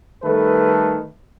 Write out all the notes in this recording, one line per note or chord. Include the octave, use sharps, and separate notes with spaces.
D#3 G3 A3 A4 B4